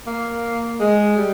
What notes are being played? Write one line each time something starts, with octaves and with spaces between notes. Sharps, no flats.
A#3
G#3
G3